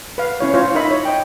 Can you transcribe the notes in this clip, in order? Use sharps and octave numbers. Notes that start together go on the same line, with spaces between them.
B4 F5
C#4 E4 C#5
E4 F4 C5 C#5 F5
D#4 E4 A#4 D#5 E5 B5
C#5
D#5 G5